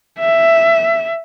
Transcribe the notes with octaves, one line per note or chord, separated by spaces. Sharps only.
E5